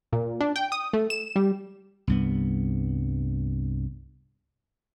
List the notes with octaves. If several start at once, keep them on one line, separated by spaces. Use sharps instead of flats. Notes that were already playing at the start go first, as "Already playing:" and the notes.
A#2
D4
G5
D#6
A3
E7
G3
C2 G2 B3